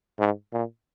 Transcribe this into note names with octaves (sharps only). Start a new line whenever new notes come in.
G#2
A#2